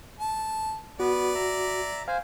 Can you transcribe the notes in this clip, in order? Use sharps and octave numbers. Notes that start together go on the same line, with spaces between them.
A5
B3 F#4 B4 D5
E5 A#5
C5 F5 G#5